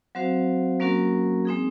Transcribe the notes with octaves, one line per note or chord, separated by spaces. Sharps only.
F#3 C4 F#4 C5 F5
F#3 A#3 C#4 F#4 A#4
G#3 C4 D#4 G#4